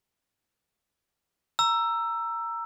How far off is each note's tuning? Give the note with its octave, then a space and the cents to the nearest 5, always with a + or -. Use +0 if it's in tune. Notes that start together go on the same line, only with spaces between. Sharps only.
A#5 +0 E6 +15